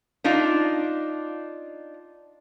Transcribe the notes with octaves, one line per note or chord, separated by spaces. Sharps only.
D4 D#4 F4